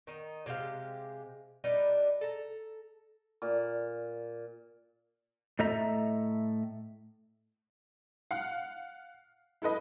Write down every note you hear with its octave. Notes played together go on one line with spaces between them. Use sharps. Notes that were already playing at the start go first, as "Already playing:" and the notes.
D#3 D#4
C3 G#3 G4 F5
G3 D4 D#4 B4
A4 A#5
A#2
A2 A3 A4 D#5 E5 A#5
F5 F#5
E4 A4 B4 D#5